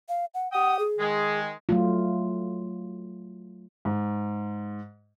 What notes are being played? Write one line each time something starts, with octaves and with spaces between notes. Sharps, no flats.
F5
F#5
G4 F#5 G5 D#6
G#4
D#3 G#3
F#3 A3 F4
G#2